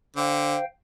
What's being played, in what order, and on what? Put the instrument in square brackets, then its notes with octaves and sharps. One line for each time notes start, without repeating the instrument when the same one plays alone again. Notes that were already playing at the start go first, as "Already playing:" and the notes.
[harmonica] D3 [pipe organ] C5 F5 G5